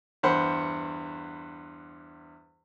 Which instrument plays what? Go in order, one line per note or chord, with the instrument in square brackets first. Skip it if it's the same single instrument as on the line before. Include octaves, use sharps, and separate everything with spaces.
[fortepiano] E2 G2 C5 F#5 B5